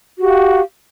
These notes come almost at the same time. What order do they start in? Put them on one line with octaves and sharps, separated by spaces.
F#4 G4 F5